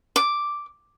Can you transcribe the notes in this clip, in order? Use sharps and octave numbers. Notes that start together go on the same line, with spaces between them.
D6